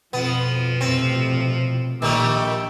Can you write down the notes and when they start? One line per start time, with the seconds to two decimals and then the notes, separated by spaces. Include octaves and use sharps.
0.13 F2 B2 F3 B3
0.81 F2 A2 C3 C4
2.02 A#1 A#2 D#3 G3 A3 G5 D6 E6